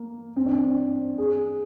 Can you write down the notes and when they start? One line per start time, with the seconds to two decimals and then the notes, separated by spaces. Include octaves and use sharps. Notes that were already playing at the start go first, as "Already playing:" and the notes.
Already playing: A#3
0.36 C4
0.46 D4
0.55 C4
1.18 G#4